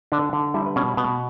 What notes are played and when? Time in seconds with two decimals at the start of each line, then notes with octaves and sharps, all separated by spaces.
0.12 D3 D4 D5
0.33 D3
0.54 G3 E4 E5
0.66 B4
0.76 B2 C#4 C#5
0.97 B2 B3 B4